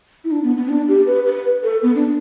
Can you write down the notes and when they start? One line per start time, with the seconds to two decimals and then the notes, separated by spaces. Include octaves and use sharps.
0.25 E4
0.31 D4
0.44 B3
0.57 B3
0.69 D4
0.88 G4
1.06 B4
1.26 B4
1.63 A4
1.83 B3
1.96 D4